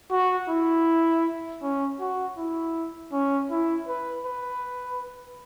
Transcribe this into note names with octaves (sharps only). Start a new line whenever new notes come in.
F#4
E4
C#4
F#4
E4
C#4
E4
B4
B4